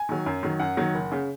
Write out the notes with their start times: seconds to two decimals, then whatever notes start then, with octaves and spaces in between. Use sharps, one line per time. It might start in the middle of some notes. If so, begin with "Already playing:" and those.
Already playing: G#5
0.09 D#3 F#3
0.26 F#2
0.43 D#3 F#3
0.59 F#2 F#5
0.77 D#3 F#3
0.94 F#1
1.12 C#3